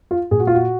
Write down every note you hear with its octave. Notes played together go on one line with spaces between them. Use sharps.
F4
A#2 G#4
F#4
F4
F#4